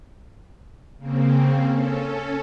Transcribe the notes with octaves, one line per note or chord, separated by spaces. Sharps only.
C#3 A#3 C4
C#4 A4